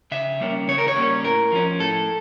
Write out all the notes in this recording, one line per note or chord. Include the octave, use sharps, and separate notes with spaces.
C#3 E5
G3 A#3 C#4
C#3 C#5
A#4
C#5
G3 A#3 C#4
A2 A#4
F3 C#4
A2 A4